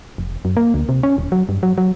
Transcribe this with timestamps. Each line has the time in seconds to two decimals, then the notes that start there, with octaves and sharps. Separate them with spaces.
0.18 F1
0.45 F#2
0.57 A#3
0.74 D2
0.89 C3
1.03 C#4
1.18 D#1
1.32 F#3
1.49 G2
1.63 F#3
1.78 F#3